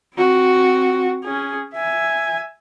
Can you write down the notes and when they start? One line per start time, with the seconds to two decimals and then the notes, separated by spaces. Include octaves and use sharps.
0.16 C4 F#4
1.23 C#4 G#4
1.74 E5 G#5